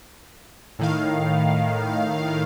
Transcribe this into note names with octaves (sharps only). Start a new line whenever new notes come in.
A2 D#3 F5